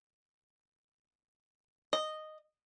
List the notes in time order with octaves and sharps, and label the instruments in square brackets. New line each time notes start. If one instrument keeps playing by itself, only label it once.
[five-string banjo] D#5